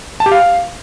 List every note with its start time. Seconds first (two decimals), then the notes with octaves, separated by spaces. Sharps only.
0.20 A5
0.26 G4
0.32 F5